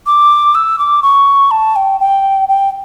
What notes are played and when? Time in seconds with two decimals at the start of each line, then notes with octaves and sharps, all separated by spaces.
0.06 D6
0.55 E6
0.79 D6
1.03 C#6
1.51 A5
1.76 G5
2.00 G5
2.49 G5